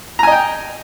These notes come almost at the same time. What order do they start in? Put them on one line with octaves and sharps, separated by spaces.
A#5 G#5 D#5 G5